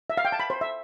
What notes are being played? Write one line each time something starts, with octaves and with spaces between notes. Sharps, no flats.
E5
F5
G5
A5
B5
C5
E5